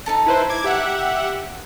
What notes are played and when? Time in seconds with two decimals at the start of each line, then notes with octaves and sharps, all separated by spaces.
0.06 D#4 A4 A5
0.27 E4 B4 C5
0.50 D6 G#6
0.64 G4 E5 F#5